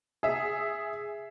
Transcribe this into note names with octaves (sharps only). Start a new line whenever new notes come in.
G#4 E5